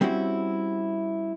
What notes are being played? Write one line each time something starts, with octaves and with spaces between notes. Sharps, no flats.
G3 C4 C#4 E4 F#4